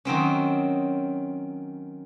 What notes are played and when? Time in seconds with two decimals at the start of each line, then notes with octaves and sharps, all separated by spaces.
0.05 D#3 F#3 C4 C#4